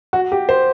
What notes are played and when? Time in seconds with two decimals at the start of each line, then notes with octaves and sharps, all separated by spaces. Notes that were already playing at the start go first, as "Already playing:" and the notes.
0.13 F#4
0.32 G4
0.49 C5